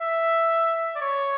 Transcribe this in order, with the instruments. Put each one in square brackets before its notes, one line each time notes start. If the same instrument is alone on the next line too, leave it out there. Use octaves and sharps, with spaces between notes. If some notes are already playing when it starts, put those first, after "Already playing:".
[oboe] E5
D5
C#5